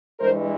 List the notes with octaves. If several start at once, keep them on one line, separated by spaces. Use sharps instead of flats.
G2 E3 G#3 A#4 C5